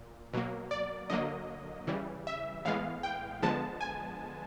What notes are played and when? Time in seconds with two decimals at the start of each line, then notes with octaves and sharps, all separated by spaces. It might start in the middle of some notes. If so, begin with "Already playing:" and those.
Already playing: A#2
0.33 B2 F#3 A#3
0.71 D5
1.10 D3 F#3 A#3 D#5
1.87 C#3 E3 G3
2.27 E5
2.65 A2 E3 G#3 B3 F5
3.03 G5
3.42 D3 F3 G#3 B3 A5
3.81 G#5